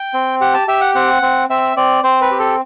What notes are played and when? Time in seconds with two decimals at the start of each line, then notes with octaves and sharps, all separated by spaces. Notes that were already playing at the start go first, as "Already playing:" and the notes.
Already playing: G5
0.14 C4
0.41 G4 F#5
0.54 A5
0.68 G4 E5
0.81 F#5
0.95 C4 F#5
1.22 C4
1.49 C4 E5
1.77 C4 D5
2.04 C4 C5
2.21 B4
2.31 G4
2.40 A4